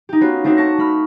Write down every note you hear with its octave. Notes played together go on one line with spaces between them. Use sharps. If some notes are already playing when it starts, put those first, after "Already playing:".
D#4 G4
B3 C#4 F4 F#4
A3 C4 D4 D#4 F#4
A5 C#6 A#6
A3 B5 F6